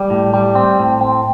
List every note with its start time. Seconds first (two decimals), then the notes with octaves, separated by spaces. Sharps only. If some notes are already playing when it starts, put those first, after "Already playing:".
Already playing: G3
0.10 A2
0.34 G3
0.55 C4
0.79 A2
1.01 C4